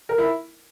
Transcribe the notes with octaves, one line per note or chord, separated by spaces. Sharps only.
A#4
E4